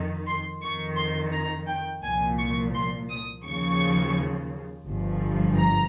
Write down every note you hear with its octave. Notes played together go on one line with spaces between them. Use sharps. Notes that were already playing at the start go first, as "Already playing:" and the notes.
Already playing: F2 D#3
C6
F2 D#3 C#6
C6
A#5
G5
C2 A#2 F3 G#5
C#6
C6
D#6
D#2 C#3 F3 C#6
G1 G2 F3
A#5